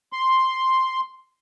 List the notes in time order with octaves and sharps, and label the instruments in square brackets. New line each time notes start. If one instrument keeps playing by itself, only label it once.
[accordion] C6